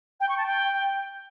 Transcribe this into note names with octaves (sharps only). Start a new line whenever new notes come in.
G5
C#6
A5
G5